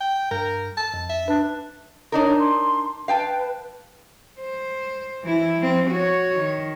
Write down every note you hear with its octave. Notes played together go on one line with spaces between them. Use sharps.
G5
G2 A#4 G6
A5
F2
E5
D4 B4
D4 D#4 A#4 C#5
C6
B4 F5 G5 A5
C5
E3 E4
F3 C4
F#4 C#5
D#3